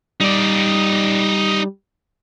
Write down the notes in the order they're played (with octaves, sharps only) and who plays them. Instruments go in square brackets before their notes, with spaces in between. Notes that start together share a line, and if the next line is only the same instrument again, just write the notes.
[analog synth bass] G3 [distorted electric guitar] D#4 D5